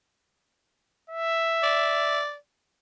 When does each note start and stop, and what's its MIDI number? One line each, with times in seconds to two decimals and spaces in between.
1.10 2.23 76
1.63 2.36 74